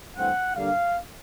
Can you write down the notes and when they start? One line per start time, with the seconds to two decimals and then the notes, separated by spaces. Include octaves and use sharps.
0.16 G2 E3 A3 C4 F#5
0.56 G2 D3 G3 A#3 D4 F5